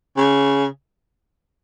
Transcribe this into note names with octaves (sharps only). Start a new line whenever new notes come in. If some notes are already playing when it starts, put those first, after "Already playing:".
C#3